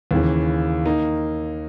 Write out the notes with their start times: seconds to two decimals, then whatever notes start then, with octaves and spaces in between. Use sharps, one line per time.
0.11 D#2 C#3 E3
0.85 D#3 A#3 D#4